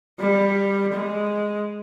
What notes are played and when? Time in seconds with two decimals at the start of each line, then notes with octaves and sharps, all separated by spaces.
0.20 G3
0.93 G#3